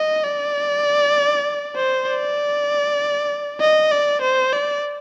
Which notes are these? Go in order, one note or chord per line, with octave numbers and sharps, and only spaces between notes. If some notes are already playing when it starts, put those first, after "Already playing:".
Already playing: D#5
D5
C5
D5
D#5
D5
C5
D5